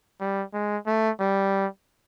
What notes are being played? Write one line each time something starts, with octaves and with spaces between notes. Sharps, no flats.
G3
G#3
A3
G3